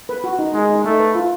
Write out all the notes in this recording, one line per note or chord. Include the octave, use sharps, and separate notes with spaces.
B4
F#4
D#4
G#3 D#4
D#4
A3 D#4
B4
F4